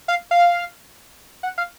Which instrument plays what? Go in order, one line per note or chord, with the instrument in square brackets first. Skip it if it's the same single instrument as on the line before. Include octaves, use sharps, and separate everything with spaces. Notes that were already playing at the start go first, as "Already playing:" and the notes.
[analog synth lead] F5
F5
F#5
F5